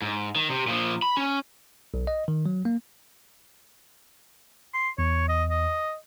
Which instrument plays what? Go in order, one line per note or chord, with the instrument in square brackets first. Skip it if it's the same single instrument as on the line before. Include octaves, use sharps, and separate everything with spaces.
[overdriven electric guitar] G#2
D#3
C3
A#2 F3
B5
C#4
[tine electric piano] B1
D#5
D#3
F#3
A#3
[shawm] C6
[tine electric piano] E2 [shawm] C#5
[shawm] D#5
D#5